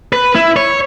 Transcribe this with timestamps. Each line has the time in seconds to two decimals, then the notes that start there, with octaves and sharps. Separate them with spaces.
0.13 B4
0.35 E4
0.56 C#5